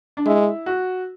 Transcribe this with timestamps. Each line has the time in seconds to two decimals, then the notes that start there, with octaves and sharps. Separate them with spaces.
0.17 D4
0.26 G#3 E4
0.66 F#4